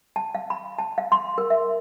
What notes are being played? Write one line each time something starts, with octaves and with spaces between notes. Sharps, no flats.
A5
F5
B5
A5
F5
C6
A#4
E5